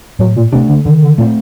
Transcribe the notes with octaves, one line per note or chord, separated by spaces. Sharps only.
A2 F#3
A#2
C3 A3 D4
D3
D3 D#3
D3
A#2 A3 C4